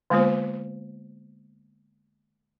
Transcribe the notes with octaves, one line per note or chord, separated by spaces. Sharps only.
D3 G#3 A#3 B3 F4 C5